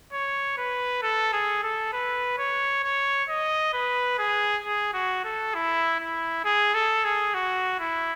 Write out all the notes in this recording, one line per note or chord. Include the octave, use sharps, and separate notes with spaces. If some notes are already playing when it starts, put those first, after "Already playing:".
C#5
B4
A4
G#4
A4
B4
C#5
C#5
D#5
B4
G#4
G#4
F#4
A4
E4
E4
G#4
A4
G#4
F#4
E4